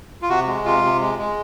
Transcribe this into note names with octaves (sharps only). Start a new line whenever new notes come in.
F4
C3 F#4
G#3
C3 F4
C3
G#3
G#3